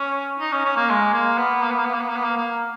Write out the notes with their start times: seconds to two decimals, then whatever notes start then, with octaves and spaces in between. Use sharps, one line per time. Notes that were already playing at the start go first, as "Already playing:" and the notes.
Already playing: C#4
0.40 D#4
0.53 C#4
0.65 C#4
0.77 A#3
0.90 G#3
1.14 A#3
1.38 B3
1.63 A#3
1.70 B3
1.79 A#3
1.85 B3
1.94 A#3
2.01 B3
2.09 A#3
2.16 B3
2.24 A#3
2.37 A#3